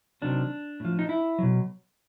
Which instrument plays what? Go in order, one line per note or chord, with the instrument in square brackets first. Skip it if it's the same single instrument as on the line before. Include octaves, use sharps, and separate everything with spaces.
[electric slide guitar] C3 D#3 F#3 D4
A2 F3
D#4
E4
B2 F#3